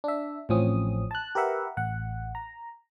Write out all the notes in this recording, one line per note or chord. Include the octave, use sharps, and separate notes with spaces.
D4 E5
A1 A2 F3 C4 C#4 D#6
A5 F#6
G4 A#4 B4 E5 F#5
A1 F#5
A#5